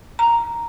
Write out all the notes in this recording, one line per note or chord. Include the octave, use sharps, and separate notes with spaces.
A#5